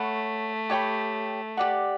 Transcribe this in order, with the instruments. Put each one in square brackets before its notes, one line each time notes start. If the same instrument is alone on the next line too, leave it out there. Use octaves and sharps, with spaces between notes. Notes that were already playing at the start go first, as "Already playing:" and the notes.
Already playing: [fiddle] A3 [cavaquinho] C#5 F#5 B5
[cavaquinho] G4 C#5 G5 B5
G4 D5 F#5